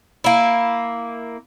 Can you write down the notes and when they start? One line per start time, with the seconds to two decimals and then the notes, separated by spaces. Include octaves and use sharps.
0.24 A#3 E4